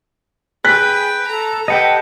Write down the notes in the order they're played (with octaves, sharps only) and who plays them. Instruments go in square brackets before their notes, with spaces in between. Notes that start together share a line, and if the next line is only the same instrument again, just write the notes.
[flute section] G#4 [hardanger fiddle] B4 G5 [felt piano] F#6 B6
[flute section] A4 [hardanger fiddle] A#5
[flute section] G4 A4 A5 [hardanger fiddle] B4 [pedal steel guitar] D#5 F#5 G5